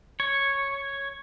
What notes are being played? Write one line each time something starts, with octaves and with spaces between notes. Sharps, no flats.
C#5